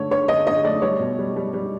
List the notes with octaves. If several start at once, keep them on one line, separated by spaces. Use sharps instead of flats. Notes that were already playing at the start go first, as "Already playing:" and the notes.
Already playing: D3 A3 C#5
D3 C#5
D3 D#5
D3 D#5
A3 D5
G3 C#5
B2
G3
G3
G3